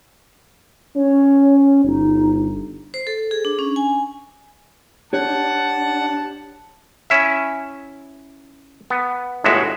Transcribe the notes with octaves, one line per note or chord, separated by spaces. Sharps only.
C#4 C#5
G1 D#4
C5
A4
G#4
D4
C#4
G#5
D4 G4 C#5 F#5 A5
C#4 E4 E5
B3
G1 A2 G#3 F#4 E5